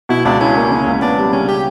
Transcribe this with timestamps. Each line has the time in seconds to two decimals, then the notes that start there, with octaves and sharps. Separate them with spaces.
0.09 B2 E4
0.25 C#2 D4
0.40 C#4 E4
0.56 A#3
0.71 C#3
0.87 C#2
1.02 B3 D4
1.18 G3
1.33 C#3 C#4
1.48 G4